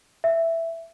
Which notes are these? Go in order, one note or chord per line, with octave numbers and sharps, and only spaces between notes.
E5